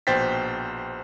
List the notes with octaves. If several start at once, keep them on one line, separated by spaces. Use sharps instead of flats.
A#1 B2 C5 G5 A6 B6